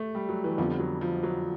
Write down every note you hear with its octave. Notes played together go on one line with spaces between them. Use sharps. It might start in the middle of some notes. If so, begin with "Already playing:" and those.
Already playing: A3
G3
F#3
E3
F2 D3 F3 G3 B3
F#3
F3
F#3